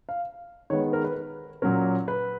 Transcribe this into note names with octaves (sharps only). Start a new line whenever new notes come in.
F5
D#3 G#3 B3 C#5
A#4
B4
B4
A#2 F#3 A#3 C#4 A#4
B4